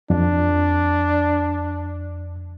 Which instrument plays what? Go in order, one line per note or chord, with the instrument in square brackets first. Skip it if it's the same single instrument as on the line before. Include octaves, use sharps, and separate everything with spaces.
[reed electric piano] F2 [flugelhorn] D4